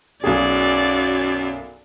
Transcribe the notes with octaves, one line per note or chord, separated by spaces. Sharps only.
B1 F#2 G#4 D5